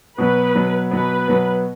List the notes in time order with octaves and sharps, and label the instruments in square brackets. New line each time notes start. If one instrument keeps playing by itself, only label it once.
[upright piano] B2 F#3 B3 [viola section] B4
[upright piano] B2 F#3 B3
[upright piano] B2 F#3 B3 [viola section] B4
[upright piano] B2 F#3 B3